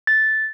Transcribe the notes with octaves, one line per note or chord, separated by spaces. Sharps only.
A6